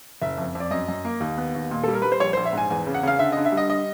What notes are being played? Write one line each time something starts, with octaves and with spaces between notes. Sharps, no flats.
F#1 E5
F2
F2
D5
F#2 D#5
F#2
A#3
D#2
B3
D#2
A#2
A4
G3
A#4
G3 B4
C5
A#1 C#5
C5
A#1
E5
G#2 G#5
E2 G#5
C#3
F#5
C#3 F5
D3 E5
D#5
D3
E5
G3
D#5
D#5